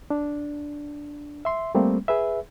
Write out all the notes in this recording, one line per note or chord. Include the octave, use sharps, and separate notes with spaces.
D4
E5 C6
G3 A3 A#3 C4
G#4 B4 E5